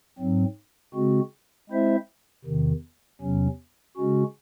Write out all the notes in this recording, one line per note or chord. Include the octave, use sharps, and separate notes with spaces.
G#2 F#3 C4
C#3 G#3 C4 F#4
G#3 C4 E4 C5 E5
E2 C3 D#3
E2 C3 F#3 C#4
C#3 G#3 C#4 F#4